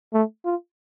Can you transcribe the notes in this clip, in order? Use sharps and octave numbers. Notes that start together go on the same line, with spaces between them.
A3
F4